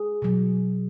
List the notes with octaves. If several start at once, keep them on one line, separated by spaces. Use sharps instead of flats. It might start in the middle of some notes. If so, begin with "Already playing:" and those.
Already playing: G#4
B2 F#3